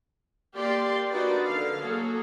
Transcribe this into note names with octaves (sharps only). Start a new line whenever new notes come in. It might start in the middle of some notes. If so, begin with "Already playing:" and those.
A#3 G4 D5 F5 C6
D4 D#4 F#4 A#4 B4 D5
D3 F5
F#3 A#3 G#4 A4